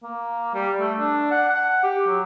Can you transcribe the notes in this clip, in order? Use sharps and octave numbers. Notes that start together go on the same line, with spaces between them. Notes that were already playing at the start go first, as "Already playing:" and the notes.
A#3
G3
A3
D4
F#5
F#5
G4
F#3